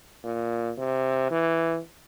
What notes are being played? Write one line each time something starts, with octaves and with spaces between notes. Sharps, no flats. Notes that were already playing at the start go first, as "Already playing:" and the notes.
A#2
C3
E3